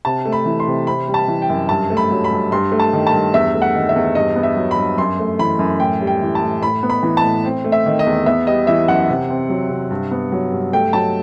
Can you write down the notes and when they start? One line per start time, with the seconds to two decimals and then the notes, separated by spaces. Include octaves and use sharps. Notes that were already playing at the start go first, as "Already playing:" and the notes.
0.05 C3 A5
0.25 A3
0.32 B5
0.46 E3
0.60 C6
0.67 C3
0.87 C4 B5
1.08 G3
1.14 A5
1.28 E3
1.42 G5
1.49 F#2
1.69 G2 A5
1.90 A3
1.97 B5
2.11 F#3
2.24 B5
2.31 G2
2.52 G2 C6
2.72 A3
2.80 A5
2.93 D#3
3.07 A5
3.13 G2
3.34 E2 E5
3.54 A3
3.62 F#5
3.75 D#3
3.89 E5
3.96 E2
4.15 G2 D#5
4.36 B3
4.43 E5
4.57 F#3
4.71 B5
4.77 G2
4.97 F#2 C6
5.19 A3
5.39 E3 B5
5.59 F#2
5.80 A2 G5
6.01 G3
6.07 G5
6.22 E3
6.35 A5
6.42 A2
6.62 A2 B5
6.83 B3
6.90 B5
7.03 E3
7.17 A5
7.23 A2
7.45 C4
7.64 A3
7.72 E5
7.86 D#3
7.99 D#5
8.06 E2
8.26 B3 E5
8.47 G3 D#5
8.67 E3 E5
8.88 F#2 F#5
9.09 C3
9.30 C4
9.50 F#3
9.70 C3
9.91 G2
10.11 B3
10.32 F#3
10.52 G2
10.73 A3 G5
10.93 F#3 A5